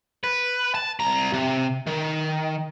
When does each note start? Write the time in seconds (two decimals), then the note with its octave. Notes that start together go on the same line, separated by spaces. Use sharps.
0.24 B4
0.75 A5
1.00 C2 A#5
1.33 C3
1.86 D#3